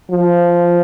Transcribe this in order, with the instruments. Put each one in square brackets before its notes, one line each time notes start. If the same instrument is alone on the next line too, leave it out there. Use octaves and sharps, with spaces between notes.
[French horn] F3